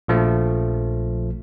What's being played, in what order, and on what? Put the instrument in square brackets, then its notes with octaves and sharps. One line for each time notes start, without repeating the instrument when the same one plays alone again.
[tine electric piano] A#1 F3 A3